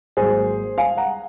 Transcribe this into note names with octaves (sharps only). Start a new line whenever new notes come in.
G#1 G#2 F#3 A#3 G#4 C5
F5 G#5
F#5 A#5